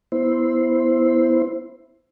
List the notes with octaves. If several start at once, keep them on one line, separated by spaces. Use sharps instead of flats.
B3 E4 C5